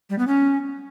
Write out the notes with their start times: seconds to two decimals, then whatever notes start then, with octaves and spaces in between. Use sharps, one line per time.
0.10 G3
0.19 B3
0.27 C#4